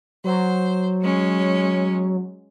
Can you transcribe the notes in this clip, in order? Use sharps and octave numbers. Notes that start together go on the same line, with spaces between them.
F#3 C5
G#3 C#4